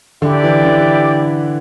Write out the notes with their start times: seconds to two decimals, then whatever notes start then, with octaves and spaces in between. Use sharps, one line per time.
0.22 D3 E4 G4 D5 G5
0.44 E3
0.65 D3